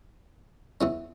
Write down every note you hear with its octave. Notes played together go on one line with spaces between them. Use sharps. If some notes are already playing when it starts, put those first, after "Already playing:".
E2 E3 C#4